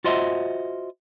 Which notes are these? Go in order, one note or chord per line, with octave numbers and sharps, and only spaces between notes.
F4 F#4 C5 D#5 E5